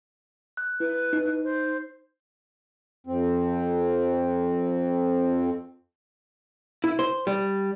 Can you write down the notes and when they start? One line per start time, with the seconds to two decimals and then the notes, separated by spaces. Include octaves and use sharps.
0.57 F#6
0.80 E4 B4
1.13 D#4
1.44 C5
3.07 F2 C4
6.84 E4
6.99 C5
7.27 G3